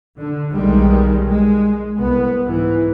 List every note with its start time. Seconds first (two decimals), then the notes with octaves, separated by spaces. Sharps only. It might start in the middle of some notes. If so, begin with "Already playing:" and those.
0.19 D3
0.53 B1 D#3 G3 G#3
1.28 G#3
1.97 C2 B3
2.44 G#2 E3